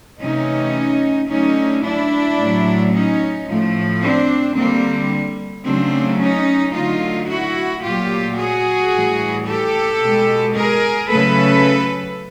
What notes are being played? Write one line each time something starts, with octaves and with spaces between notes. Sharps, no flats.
C3 E3 A3 C#4 D#4
D3 F#3 A3 C#4 D#4
D4 E4
A2 F#3 A3
C#4 D#4
A2 F3 A3
C4 D4
D3 G3 A#3 C4
C#3 F#3 A3 C4 D4
C#4 D#4
D3 F#3 A3 D#4 F4
E4 F#4
A#2 F#3 A3 F4 G4
F#4 G#4
A2 E3 G3
G4 A4
B2 G#3
G#4 A#4
C#3 F#3 A3 A4 B4